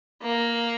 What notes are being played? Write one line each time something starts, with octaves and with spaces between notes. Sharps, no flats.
A#3